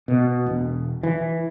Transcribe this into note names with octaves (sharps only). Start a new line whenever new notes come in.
B2
E1
E3